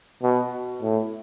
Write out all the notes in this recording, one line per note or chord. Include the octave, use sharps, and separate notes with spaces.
B2
A2